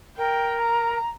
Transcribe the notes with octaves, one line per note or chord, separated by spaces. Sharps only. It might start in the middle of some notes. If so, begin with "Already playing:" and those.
A#4 G5
A#5